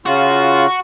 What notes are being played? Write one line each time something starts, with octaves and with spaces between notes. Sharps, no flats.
C#3 F4 F#4